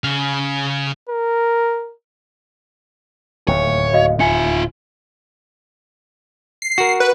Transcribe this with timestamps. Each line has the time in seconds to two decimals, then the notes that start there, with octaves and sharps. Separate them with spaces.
0.04 C#3 F5
1.09 A#4
3.48 D1 D#2 A2 C#5
3.93 F#4 D#5 F5
4.20 F4 E5 G#5 C#7
6.62 C7
6.78 F#4 A#4
7.00 B4